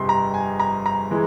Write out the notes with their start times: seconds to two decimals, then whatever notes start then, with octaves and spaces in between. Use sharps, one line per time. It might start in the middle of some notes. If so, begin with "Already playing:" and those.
Already playing: G1 F2 C3 C6
0.09 A#5
0.34 G#5
0.60 A#5
0.86 A#5
1.11 E3 G#3